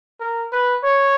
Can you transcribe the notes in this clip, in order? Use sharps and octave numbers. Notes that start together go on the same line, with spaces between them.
A#4
B4
C#5